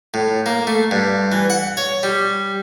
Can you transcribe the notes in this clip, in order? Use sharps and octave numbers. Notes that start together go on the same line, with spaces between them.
A2
A#3
A3
G2
E3
F#5
C#5
G3